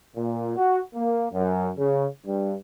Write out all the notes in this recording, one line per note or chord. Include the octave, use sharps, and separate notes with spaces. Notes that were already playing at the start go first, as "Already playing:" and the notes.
A#2
F#4
A#3
F#2
C#3
G2